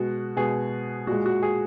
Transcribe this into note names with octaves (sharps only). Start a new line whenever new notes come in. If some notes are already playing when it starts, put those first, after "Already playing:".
Already playing: B2 G#3 F#4
B2 G#3 G#4
A#2 G#3 F#4
F#4
G#4